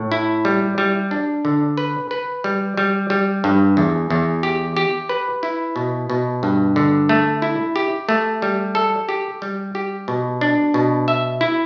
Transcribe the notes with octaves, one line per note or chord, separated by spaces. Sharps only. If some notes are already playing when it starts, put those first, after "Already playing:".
Already playing: A2
E4
G3
G3
D4
D3
B4
B4
G3
G3
G3
G2
E2
E2
G4
G4
B4
E4
B2
B2
G2
D3
A3
E4
G4
A3
G3
A4
G4
G3
G4
B2
D4
B2
E5
E4